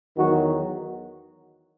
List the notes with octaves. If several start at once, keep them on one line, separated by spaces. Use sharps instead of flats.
E2 D#3 F#3 F#4